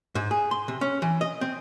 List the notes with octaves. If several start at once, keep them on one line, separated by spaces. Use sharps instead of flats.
G#2
G#4
C6
C3
C#4
E3
D#5
C4